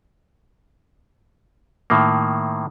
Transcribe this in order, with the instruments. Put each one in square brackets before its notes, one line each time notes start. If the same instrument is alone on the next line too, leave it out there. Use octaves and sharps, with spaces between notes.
[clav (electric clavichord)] A2 D#3 A#3